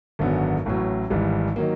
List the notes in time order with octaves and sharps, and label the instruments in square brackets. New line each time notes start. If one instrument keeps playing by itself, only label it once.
[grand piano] G#1 F#2 D3 F#3 B3
A1 A2 F#3
G#1 G#2 E3 G3
D#3 F#3 A#3